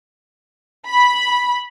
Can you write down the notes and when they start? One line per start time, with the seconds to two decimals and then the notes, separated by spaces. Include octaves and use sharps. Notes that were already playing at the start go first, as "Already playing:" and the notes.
0.88 B5